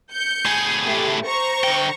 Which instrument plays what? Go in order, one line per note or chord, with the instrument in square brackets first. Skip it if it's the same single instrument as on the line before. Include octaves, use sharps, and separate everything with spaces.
[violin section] G6 C#7
[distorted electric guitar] A2 G#4
[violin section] A3 G4
C5 A#5 C#6
[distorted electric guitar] D3 G5